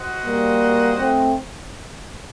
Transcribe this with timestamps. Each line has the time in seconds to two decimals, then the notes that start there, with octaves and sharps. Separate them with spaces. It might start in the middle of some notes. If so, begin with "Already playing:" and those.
Already playing: F#4 C5 D#5 F#5
0.24 G3 A#3
0.97 A3 C4